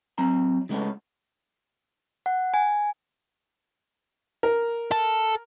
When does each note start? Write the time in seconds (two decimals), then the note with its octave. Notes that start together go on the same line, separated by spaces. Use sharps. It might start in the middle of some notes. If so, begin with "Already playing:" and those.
0.18 F#3 C4 A#5
0.69 C#3 G#3 A3 B3 C#4
2.26 F#5
2.54 G#5
4.43 A#4
4.92 A4